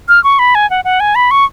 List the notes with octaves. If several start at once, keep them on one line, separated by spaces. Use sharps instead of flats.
F6
C#6
B5
G#5
F#5
F#5
G#5
B5
C#6